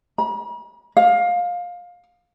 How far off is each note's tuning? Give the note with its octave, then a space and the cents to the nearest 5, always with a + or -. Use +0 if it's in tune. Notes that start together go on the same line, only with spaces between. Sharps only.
B5 -45
F5 +20